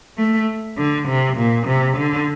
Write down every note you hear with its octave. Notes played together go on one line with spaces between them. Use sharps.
A3
D3
C3
A#2
C3
D3